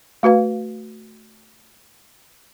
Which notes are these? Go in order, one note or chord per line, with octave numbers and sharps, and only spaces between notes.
A3 F#4 B4 F5